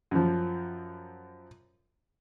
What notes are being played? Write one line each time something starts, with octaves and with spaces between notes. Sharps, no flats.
F#2 F3